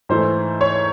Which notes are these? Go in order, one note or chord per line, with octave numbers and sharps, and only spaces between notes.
G#2 E3 A3 C5
C#5